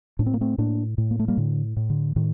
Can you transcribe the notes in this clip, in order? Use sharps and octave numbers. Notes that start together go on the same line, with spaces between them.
A2 D4
C4
A#3
A3 C4
A2 A#3 D4
A2
A#3
A3
G3 A#3
A2 D3
A2
D3
A2 D#3